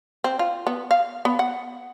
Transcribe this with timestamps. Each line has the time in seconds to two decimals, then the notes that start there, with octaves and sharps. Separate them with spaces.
0.24 C4
0.39 F4
0.67 B3
0.91 F5
1.25 B3
1.39 F#5